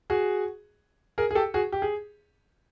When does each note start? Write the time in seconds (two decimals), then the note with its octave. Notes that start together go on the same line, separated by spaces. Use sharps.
0.10 F#4 G#4
1.18 G#4 A#4
1.31 G#4
1.35 G4 A4
1.54 F#4 G#4
1.72 G4
1.82 G#4